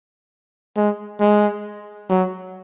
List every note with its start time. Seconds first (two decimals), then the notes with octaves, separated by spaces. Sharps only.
0.76 G#3
1.21 G#3
2.10 F#3